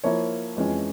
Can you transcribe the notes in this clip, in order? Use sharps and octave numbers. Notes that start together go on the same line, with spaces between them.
F3 A#3 E4 A#4 C#5
F2 E3 G#3 C#4